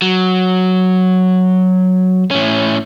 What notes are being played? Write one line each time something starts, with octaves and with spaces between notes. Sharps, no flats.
F#3
A2 C#4